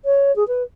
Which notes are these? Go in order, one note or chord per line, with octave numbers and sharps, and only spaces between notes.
C#5
G#4
B4